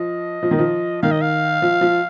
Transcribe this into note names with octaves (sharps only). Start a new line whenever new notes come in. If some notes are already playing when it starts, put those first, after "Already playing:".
Already playing: F3 D#5
F3
D#3
F3
D#3 F5
D#5
F5
F3
F3